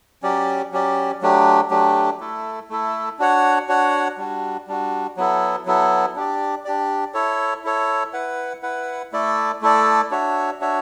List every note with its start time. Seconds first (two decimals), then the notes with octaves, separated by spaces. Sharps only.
0.23 F#3 C#4 G4 D5
0.72 F#3 C#4 G4 D5
1.21 F#3 A3 D4 G4
1.70 F#3 A3 D4 G4
2.20 A3 E4 A4
2.70 A3 E4 A4
3.19 D4 F#4 C#5 F#5
3.69 D4 F#4 C#5 F#5
4.18 G3 D4 F#4
4.68 G3 D4 F#4
5.17 F#3 B3 E4 A4
5.66 F#3 B3 E4 A4
6.16 D4 G4 D5
6.65 D4 G4 D5
7.14 E4 A4 C#5
7.64 E4 A4 C#5
8.13 E4 B4 F#5
8.63 E4 B4 F#5
9.12 A3 E4 A4 D5
9.62 A3 E4 A4 D5
10.11 D4 F#4 C#5 E5
10.60 D4 F#4 C#5 E5